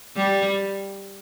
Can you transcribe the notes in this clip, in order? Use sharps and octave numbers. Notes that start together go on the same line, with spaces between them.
G3